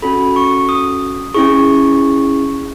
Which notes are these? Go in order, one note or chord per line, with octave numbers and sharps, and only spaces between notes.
C#4 F#4 A4 B5
C#6
D#6
C#4 E4 G#4 C#6